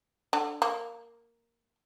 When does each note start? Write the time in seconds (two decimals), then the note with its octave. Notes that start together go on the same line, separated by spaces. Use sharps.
0.33 D3
0.62 A#3